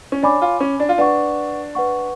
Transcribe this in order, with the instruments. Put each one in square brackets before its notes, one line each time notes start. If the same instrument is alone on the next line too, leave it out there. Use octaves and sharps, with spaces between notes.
[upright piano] C#4
[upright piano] D4 [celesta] C#5 G#5 B5 D6
[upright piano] F4
C#4
D4
F4
[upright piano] D4 [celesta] B4 F#5 C#6
[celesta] B4 F#5 C#6